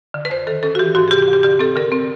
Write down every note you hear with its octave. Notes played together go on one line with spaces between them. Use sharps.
D3
B4
F2 C5
D#3 A4
C#4 A4
F#4
E3 G4
G#2 F#4
G#4
C3 G4
G4
D2
G4
D3 G4
C4 A4
D3 A#4
C4